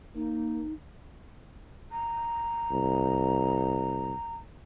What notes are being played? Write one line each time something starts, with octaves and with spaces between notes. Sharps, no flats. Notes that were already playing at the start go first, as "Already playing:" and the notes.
A#3 D#4
A#5
C2